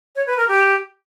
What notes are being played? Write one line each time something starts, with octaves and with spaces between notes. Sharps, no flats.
C#5
B4
A#4
G4